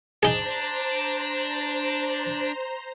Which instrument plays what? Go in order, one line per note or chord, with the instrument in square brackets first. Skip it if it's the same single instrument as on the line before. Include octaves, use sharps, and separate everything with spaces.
[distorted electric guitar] D4 [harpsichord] D#4 G#4 [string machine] C5 A#5